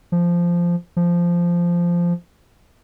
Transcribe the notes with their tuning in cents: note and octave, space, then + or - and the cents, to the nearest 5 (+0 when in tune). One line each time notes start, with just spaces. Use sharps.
F3 -10
F3 -10